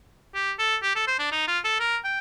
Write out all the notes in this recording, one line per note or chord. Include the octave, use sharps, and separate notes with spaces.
G4
A4
G4
A4
C5
D4
D#4
F4
A4
A#4
G5